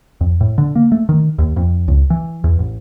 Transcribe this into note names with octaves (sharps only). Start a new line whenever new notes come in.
F2
A2
D3
A#3
A3
D#3
D#2
F2
C#2
E3
E2
A1